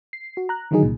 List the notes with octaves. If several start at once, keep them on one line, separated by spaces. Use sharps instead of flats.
C7
F#4
A#5 F#6
D3 D#3 F#3 D#4 G#4
C2 A#2